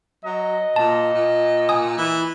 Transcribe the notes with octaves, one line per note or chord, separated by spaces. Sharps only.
F#3 D#5
A#2 A5
A#2
G#5 D#6
E3